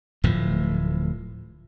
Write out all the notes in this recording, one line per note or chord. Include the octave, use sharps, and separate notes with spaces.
D1 A2 F3